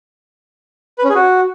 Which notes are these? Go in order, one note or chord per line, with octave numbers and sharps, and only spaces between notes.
B4
C#4
G#4
F#4